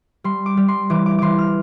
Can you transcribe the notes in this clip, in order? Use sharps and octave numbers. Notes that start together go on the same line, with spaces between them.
G3 C6
D6
G3
C6
E3 D6
D6
E3 C6 D6
F6